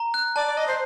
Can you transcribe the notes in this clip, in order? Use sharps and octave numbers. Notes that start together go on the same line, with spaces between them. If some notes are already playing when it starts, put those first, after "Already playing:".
Already playing: A#5
F#6
D5 A5
D5
D#5 A5
C5